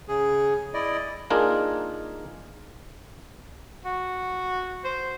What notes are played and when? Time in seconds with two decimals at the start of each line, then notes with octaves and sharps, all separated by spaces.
0.08 C#3 G#4
0.74 E4 D5 D#5
1.30 A#3 D4 D#4 F4 G#4 A#4
3.84 F#4
4.84 C5